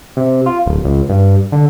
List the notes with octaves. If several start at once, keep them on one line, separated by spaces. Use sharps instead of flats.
C3
F4
D1
C#2
G2
D3